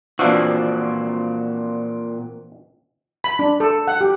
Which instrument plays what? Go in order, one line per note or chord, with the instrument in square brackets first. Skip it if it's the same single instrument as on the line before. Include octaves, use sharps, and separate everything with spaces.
[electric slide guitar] A#2 C4 F#4 [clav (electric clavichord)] E3 F3 D4
[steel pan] B5
D4
A4
F#5
G4